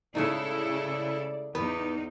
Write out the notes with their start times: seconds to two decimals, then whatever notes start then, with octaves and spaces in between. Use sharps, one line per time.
0.15 C#3 G#3 A3 D#4 E4 A4 D5
1.55 E2 B3 D#4 B4